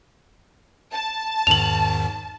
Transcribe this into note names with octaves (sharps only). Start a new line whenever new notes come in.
A5
E2 G#2 D#3 F7 F#7